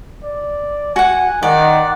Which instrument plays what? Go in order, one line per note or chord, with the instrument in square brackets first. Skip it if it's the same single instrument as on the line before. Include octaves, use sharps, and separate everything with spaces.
[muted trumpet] D5
[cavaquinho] F#4 F#5 [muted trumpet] G#5
[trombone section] D#3 [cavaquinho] D5 [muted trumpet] F#5